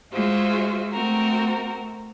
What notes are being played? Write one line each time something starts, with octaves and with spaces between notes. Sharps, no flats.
G#3 F4 F#4 C5 E5
A3 C4 F#4 A#4